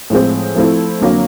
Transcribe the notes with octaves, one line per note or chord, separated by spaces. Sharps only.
A2 F3 G#3 C4
F3 A3 C4 E4 A4
F2 D3 F#3 A#3